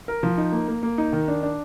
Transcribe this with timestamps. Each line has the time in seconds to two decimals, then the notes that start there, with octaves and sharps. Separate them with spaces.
0.08 A#4
0.23 F3
0.38 D#4
0.52 A#3
0.68 A#3
0.83 A#3
0.98 D#4
1.13 D#3
1.28 D4
1.43 D4